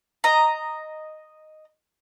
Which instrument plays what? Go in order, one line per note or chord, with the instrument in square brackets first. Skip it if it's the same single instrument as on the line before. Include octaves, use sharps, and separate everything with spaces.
[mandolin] D#5 A#5